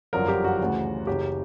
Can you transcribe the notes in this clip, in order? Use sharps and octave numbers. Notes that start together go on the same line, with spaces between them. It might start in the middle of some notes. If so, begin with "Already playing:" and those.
G1 F#2 D3 F3 A#4
G4
F#4
D2 C#3 E3
F#1 F#2 C#3 G4